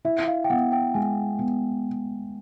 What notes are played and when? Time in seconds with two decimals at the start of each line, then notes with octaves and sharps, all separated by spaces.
0.05 E4 E5
0.27 F5
0.44 G5
0.50 B3 F#5
0.72 G5
0.94 G#3 G#5
1.39 B3